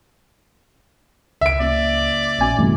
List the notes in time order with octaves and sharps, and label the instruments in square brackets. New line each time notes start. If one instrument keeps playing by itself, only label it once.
[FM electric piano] C#2 [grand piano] E5 D7
[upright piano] F#1 [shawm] D5
[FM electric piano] A#1 G#5 [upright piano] B2 C#4
[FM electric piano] G2 C3 A3 [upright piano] E3